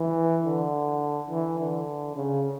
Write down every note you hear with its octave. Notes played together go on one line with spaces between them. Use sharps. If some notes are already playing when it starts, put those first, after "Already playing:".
Already playing: E3
D3
E3
D3
C#3